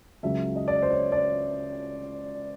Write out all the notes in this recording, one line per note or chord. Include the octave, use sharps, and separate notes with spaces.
C#2 C#3 F#3 E5
D#5
D5
C5
C#5
D5